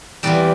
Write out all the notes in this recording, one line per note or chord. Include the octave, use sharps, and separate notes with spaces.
E2 C3 E3 G3 D5